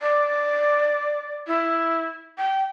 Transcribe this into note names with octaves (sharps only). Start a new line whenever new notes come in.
D5
E4
G5